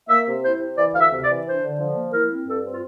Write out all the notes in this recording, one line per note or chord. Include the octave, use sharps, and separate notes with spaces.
A#3 E5
C3
E4 C5
C3
E3 D5
D2 F5
E5
C3
D5
E3
D4 C5
D3
F3
A#3
E4 A#4
C4
G2 A4
C4
F4